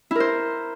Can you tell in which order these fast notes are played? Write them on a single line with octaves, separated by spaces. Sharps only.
E4 A#4 C5